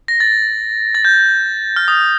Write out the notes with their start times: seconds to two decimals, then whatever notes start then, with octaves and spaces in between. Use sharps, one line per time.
0.08 A#6
0.20 A6
0.95 A6
1.05 G6
1.76 F6
1.88 D#6